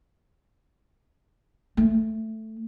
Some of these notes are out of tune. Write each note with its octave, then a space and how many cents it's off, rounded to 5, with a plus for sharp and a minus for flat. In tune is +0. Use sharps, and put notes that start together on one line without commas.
A3 +5